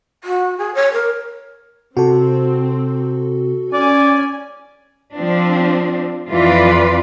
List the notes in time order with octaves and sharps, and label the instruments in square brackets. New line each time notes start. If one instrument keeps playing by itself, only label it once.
[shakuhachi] F#4
G#4
C#5
A#4
[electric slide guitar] C3 [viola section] C4 [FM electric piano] F#4 A4
[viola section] C#4 G#5 [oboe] D5
[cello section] F3 C4 D4
F2 E3 F4 B4 D5